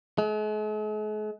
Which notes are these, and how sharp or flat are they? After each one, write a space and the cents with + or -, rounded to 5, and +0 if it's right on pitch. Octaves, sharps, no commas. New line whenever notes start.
G#3 +45